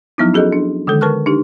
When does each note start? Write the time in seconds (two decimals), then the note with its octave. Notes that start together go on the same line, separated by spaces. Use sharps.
0.18 F3 F#3 B3 D#4 E4
0.34 C#4 F#4 G#4 A4 D#5
0.53 D4
0.87 D3 D#3 G#3 A4
1.01 A#4 B4 A5 C#6 F6 F#6
1.26 D4 D#4 G4